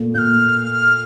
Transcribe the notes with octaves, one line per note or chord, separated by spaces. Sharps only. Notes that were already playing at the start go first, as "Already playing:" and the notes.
Already playing: A#2 A3
A#2 F6 G6